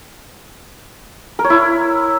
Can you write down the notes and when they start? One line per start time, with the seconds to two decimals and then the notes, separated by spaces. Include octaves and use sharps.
1.39 A#4
1.44 C#5
1.50 E4